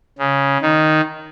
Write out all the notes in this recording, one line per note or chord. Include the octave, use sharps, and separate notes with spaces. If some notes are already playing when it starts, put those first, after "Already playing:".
C#3
D#3